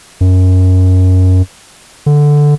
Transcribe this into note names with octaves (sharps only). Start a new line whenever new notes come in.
F#2
D3